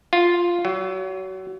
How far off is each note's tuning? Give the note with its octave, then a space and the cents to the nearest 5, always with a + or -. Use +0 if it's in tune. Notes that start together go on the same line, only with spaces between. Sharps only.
F4 +0
F#3 +30